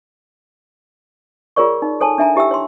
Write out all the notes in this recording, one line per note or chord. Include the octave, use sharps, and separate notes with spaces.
F4 G#4 A#4 C#5 D5 C#6
D#4
A4 C#5 G#5 A5
D4 E5 G#5 A#5
E4 G4 E5 G5 E6
C#5 C6